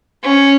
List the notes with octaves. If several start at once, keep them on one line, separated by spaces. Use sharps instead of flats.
C#4